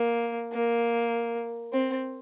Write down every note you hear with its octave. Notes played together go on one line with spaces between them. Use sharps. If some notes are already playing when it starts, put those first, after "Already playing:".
Already playing: A#3
A#3
C4